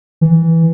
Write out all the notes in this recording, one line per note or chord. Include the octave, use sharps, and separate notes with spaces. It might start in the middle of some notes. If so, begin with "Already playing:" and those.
E3